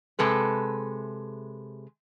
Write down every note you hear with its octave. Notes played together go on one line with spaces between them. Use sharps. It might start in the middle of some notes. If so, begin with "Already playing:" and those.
C3 G#3 A4 B4